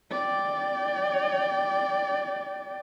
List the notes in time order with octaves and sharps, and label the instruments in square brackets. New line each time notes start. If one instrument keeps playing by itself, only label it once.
[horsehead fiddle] D5 G5